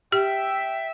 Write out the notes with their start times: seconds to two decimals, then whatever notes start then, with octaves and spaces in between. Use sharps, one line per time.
0.12 G4 E5 G5